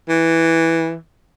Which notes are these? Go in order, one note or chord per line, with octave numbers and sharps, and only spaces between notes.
E3